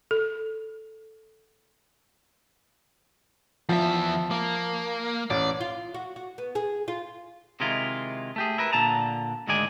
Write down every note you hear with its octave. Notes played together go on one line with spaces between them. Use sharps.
A4
E2 F3 E5
A#3
A1 D5
F4
F#4
F#4
B3
G#4
F4
C3 D#3 G#3 E4 F4
A3 G4 G#4
E4 A#4 B4
A#2 D3 A5 A#5
D2 G#2 D#3 G#3 D5 G#5